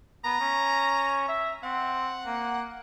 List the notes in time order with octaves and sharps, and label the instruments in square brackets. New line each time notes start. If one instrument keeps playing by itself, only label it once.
[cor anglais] B3 [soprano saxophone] A#5
[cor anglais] C#4
E5
[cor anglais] C4 [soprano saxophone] F#5
[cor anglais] A#3